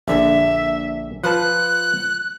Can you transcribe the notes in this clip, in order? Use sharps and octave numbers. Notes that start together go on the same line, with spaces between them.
A#1 D3 E5
F3 B4 A5 F#6